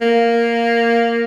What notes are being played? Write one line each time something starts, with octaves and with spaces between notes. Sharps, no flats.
A#3